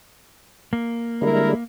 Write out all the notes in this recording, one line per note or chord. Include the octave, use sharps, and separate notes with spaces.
A#3
D3 G3 G#3 E4 A#4